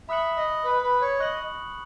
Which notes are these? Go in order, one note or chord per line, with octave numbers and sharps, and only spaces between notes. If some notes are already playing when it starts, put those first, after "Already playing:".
E5 B5 D#6 F#6 C#7 F#7
D#5
B4
B4
C#5
D#5 C#6 F#6 C#7 F#7